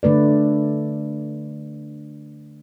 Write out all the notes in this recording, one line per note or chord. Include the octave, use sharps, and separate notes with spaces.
D3 A3 B4 D5